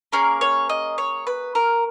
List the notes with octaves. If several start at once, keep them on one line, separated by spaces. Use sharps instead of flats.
A#3 C#4 G#4 A#4
C#5
D#5
C#5
B4
A#4